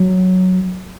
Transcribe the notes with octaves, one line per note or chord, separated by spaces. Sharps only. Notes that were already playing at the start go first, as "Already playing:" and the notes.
Already playing: F#3